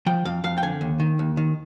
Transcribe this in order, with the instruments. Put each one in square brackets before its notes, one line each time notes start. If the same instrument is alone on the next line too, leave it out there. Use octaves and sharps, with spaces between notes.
[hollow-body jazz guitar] F3 G5
F2 F5
F2 F5
G5
D3 G#5
D#2
D#3
D#2
D#3